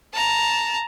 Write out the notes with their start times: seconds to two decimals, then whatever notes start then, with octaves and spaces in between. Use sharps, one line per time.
0.13 A5 A#5